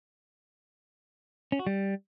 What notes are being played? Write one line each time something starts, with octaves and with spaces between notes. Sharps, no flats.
C#4
F#4
G3